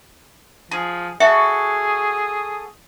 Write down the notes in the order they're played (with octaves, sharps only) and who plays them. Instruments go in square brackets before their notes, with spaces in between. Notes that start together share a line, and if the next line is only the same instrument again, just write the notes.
[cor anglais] F3 [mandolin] G#4
[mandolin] F#4 A4 C#6 [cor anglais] G#4 [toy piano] E5